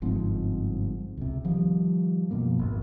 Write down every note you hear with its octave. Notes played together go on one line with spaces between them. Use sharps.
G1 G#2 F3 C4
C#2 C3
D#3 F3 G3
F#2 B2 F3 A#3
G#1 F2